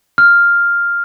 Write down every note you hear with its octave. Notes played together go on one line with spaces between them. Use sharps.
F6